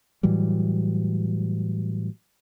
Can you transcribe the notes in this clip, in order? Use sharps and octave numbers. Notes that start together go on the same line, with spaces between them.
A2 E3 F#3 G3